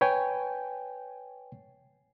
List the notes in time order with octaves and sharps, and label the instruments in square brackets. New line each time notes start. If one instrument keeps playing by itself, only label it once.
[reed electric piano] B4 C#5 G5 G#5